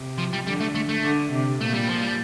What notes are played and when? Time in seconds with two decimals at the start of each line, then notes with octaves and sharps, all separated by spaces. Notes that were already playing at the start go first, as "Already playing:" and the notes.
Already playing: C3
0.18 F3
0.33 G3
0.46 D3 G3
0.60 A3
0.75 A3
0.89 A3
1.03 D3
1.32 C3
1.60 A#2 A3
1.74 G3
1.88 F3
2.02 G3